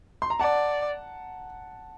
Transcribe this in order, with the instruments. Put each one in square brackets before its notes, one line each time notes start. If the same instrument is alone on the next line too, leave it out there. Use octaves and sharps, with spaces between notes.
[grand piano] C6
A#5
[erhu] D5 [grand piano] F#5 A5